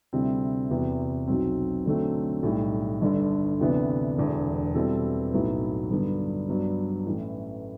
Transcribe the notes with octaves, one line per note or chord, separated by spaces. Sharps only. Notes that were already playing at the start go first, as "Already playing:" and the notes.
D2 C3 G3 C4 E4
E2 C3 E3 B3 F#4
B1 B2 F#3 C4
D3 F#3 A3 C4
B1 A2 G3
G1 G2 D3
D2 C3 E3 B3 D4
E1 E2 D3
B2 G3 C4 E4 A4
B1 A2 F#3 B3 E4
G2 D3 F#3 B3
G2 F#3 B3 D4
A1 A2 E3